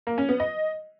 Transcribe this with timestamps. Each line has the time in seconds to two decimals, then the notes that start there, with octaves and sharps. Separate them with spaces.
0.07 A#3
0.18 C#4
0.29 B3
0.40 D#5